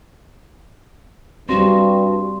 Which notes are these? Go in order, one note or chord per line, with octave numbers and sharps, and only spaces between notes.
G2 G3 C4 F#4 C6